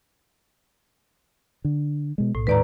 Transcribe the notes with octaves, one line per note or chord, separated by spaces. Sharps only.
D3
B2 G#3
B1 A2
D#2 G#2 D#3 B4 D5 A#5